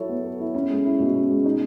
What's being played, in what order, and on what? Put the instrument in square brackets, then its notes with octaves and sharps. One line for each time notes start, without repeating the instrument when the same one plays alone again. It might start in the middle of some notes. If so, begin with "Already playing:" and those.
Already playing: [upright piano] F#3 E4 A4 C#5
B3
A4
E4
C#4
G#3
E4
B2
C#4
G#3
D#4